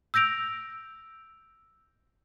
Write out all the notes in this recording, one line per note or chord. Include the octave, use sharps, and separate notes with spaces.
E6 G6 A#6 D7 F7